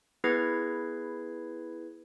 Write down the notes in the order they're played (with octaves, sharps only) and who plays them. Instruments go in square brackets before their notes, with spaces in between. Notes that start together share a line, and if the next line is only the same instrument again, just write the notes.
[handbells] B3 E4 G#4 B4 G#6 C7